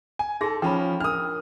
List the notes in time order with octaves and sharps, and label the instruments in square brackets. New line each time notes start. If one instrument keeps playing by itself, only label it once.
[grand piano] G#5
[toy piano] D#4 G#4 C6 [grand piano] A4 A#6
[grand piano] F3 C#4 [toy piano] G5 B5
[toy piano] D4 A#4 [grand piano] D#6 F6